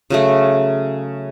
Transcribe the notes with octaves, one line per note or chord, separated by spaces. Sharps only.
C#3 F#3 A3